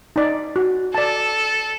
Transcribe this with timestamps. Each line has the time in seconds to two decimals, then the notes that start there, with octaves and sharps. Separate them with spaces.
0.16 D#4 D5
0.56 F#4
0.95 A4 D5 A5